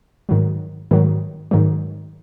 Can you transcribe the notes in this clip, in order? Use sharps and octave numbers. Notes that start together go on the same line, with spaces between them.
G#2 D#3 F#3
G#2 D#3 F#3
G#2 D#3 F#3